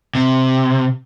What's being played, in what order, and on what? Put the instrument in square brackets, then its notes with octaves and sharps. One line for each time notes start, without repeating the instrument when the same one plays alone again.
[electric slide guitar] C3